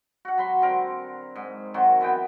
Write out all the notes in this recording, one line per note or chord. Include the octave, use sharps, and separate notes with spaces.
F#4 F#5
F#3 B5 C6
D3 C4 A#4
G#2
D#3 F#3 C4 F#4
E3 B3 G5